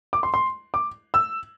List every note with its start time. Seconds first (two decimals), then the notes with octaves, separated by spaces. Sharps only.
0.13 D6
0.23 C6
0.34 C6
0.74 D6
1.14 E6